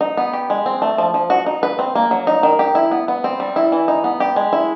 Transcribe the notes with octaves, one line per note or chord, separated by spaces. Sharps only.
D#4
B3
G4
G#3
C4
A3
F3
F3
F#4
D#4
B4
C4
A#3
F#3
D#4
D#3
G4
E4
B3
B3
C4
G3
E4
E3
D#4
B3
G4
G#3
E4